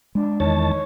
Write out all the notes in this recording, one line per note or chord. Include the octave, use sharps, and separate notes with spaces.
G#3 D4
E2 D#3 C#5 A5